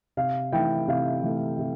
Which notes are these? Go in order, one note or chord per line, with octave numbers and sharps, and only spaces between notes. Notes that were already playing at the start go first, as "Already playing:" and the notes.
C3 F5
E3 A3 E4 G5
C3 F5
E3 A3 E4
C3